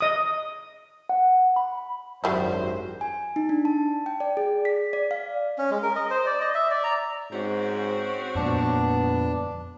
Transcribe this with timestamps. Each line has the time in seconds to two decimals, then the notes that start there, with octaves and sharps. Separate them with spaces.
0.01 D#5 D#6
1.09 F#5
1.56 B5
2.24 G#1 F#2 F#3 G3 E4 C5
3.01 G#5
3.36 D#4
3.49 D4
3.65 A5
4.06 G5
4.20 D5
4.37 G#4
4.65 B6
4.93 D5
5.11 F5
5.58 C#4
5.71 G#3
5.83 A#4
5.96 D#5
6.10 C5
6.26 D5
6.41 D#5
6.55 E5
6.71 D5
6.84 A#5
7.31 G#2 C4 C#4 F#4
8.36 F2 A#2 B3 D4